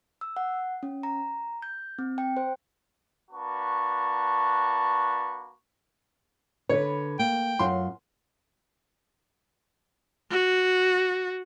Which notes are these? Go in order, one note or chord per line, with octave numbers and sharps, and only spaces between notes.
E6
F#5
C#4
A#5
G6
C4
G5
C5
A#3 D4 F#4 B4 A5 C#6
D3 B4 C#5
A#3 G5
F#2 F4 F#5 C6
F#4